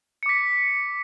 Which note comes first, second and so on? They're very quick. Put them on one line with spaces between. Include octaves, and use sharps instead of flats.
C#7 D6 B6